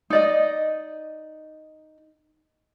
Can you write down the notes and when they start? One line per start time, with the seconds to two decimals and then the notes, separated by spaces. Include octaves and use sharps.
0.10 D#4 D5 D#5